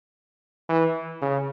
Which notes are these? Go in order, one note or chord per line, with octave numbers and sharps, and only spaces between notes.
E3
C#3